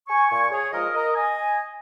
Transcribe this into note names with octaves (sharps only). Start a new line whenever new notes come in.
G#5 C#6
A#2 G#5 C#6
G#4 C#5
F3 G#3 F4 A#4 D#5
A#4 D#5
D#5 G#5